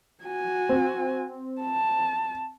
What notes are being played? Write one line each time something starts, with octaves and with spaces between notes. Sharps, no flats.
F#4 G#5
C4
A5